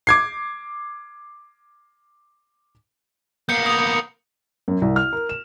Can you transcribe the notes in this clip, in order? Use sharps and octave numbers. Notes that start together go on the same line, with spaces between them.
D6 G#6 C7
A#3 B3 G6 C#7
D#6 F7
F#2
C2
F6
A#4
E7